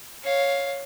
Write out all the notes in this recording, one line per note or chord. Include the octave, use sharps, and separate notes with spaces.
C#5 F5